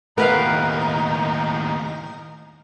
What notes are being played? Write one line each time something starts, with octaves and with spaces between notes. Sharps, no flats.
D#2 A2 B3 D#4 A#4 B4 F5